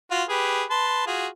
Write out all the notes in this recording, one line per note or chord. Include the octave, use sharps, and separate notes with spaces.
F4 F#4
G4 G#4 B4
B4 A5 C6
F4 F#4 G#4